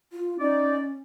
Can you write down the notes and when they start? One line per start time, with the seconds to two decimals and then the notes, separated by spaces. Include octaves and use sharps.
0.13 F4
0.40 C#4 D#4 D5